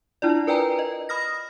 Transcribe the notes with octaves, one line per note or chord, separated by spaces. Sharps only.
D4 E4 F4 D5
A#4 B4 D5 G5 G#5 A#5
D#5
B5 D#6 F6 A#6